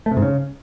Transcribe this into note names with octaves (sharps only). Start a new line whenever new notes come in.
A3
C3
G#2
C#3